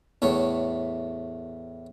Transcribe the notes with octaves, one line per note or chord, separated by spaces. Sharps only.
E2 A2 A3 C#5